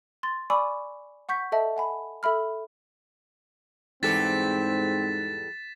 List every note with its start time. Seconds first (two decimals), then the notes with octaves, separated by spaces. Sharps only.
0.23 C6 A6
0.50 D5 G#5 B5 C#6 D6 E6
1.29 F#5 C#6 G6 B6
1.52 A4 D#5 E5 A5
1.77 F#5 G#5 B5
2.23 A4 E5 B5 F6
4.03 E2 G#2 G3 C4 A4 A6 B6 E7